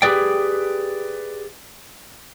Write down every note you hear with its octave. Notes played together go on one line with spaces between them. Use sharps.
G4 G#4 B4 D5 G5